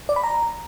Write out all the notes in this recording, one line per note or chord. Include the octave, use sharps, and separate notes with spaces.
D5
B5
A#5